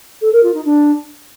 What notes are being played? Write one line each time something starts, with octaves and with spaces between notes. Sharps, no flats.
A4
A#4
F4
D#4
D4